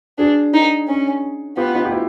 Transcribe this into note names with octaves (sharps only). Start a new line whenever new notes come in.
D4 F#4 G#4
D#4
C#4
B3 F4 G4
D#4 F4
G4
E4 F#4